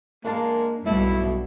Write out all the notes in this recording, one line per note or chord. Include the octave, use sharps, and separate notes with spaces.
E2 G#3 A#3 D4 A#4 F5 A5
B1 G2 B2 A3 B3 E4